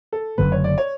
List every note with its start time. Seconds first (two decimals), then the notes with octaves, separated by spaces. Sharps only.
0.13 A4
0.38 F#1 F#2 D3 A3 B4
0.52 C#5
0.64 D5
0.78 C#5